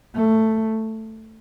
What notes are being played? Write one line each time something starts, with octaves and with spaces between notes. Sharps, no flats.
A3